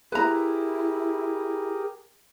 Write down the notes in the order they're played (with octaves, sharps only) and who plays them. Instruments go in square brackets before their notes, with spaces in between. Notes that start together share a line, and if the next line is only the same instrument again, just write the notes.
[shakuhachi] E4 [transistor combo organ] G4 G#4 A#4 [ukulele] B4 A#5